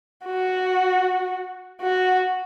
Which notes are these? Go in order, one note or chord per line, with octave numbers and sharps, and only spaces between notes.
F#4
F#4